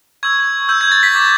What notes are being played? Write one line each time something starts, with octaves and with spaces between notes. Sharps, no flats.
C#6 E6 G6 G#6
C#6 E6 G6
G#6
A6
B6
D6 G6